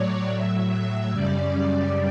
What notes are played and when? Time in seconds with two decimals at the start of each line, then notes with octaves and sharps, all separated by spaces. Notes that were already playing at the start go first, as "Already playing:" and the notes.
Already playing: A2 F#3 C#5 D5
0.29 A2 F#3 E5
0.71 E5
1.11 F#2 C#3 G3 D5